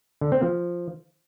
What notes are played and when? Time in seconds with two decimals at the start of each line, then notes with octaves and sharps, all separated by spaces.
0.21 D3
0.32 C4
0.42 F3